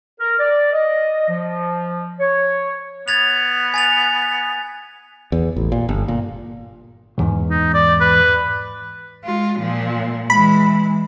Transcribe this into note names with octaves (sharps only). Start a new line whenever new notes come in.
A#4
D5
D#5
F3
C#5
B3 G#6 A6 F7
G#5 A6 F7
E2
A1
A#2
G1
A#2
B1 E2 G#2
D#4
D5
B4
G#3 F4
A#2 F3
E3 G#3 B5